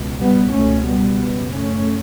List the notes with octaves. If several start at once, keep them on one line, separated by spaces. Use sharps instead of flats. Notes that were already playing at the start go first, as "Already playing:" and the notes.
Already playing: C#2 B2
G3 B3
C#2 B2 A3 C#4
G3 B3
C#3
F#2
A3 C#4